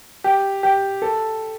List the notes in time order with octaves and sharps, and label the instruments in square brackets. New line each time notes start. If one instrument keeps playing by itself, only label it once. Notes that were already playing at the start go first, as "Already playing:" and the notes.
[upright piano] G4
G4
A4